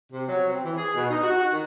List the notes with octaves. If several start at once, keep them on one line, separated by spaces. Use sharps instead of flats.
C3
F#3
C4
E3
G#4
B2
D#4
F#4
F#4
D#3